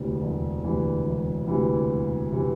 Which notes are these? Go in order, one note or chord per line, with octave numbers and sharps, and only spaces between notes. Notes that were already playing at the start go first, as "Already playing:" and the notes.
Already playing: E1 D2 C3 E3
E1
D2 C3 E3
E1
D2 C3 E3
E1
C3 E3